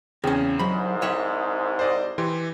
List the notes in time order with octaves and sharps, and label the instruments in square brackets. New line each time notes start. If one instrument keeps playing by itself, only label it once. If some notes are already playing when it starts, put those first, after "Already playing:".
[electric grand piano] E2 C#3 G#4 [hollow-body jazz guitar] C4 C#4
[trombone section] C2 G#2 [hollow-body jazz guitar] F#3 B5 [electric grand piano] C5
[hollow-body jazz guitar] C#5 E5 F#5
[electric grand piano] C5 D5 D#5
E3 G4 C6